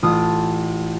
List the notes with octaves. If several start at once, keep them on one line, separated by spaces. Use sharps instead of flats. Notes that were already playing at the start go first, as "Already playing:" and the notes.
A1 F4 A5 D#6